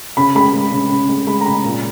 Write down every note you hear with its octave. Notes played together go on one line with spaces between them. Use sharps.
C#3 B5
G#3 B5
G#3
C#3
C#3
G#3
G#3 B5
A#5
C#3 B5
A#2